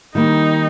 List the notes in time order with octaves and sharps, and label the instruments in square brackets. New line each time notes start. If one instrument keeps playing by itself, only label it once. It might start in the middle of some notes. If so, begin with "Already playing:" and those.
[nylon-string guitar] D#3 G3 A#3 [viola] D#4